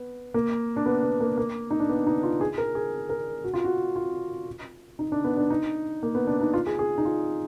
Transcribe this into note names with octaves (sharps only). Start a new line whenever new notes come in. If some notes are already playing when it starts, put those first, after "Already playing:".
Already playing: B3
A#3
D4
B3
B3
A#3
A#3
D#4
D4
B3
D#4
F4
G#4
A#4
G#4
A#4
F#4
F4
F#4
F4
D#4
D4
B3
D4
D#4
A#3
B3
D4
D#4
F4
G#4
G#4
D#4
F4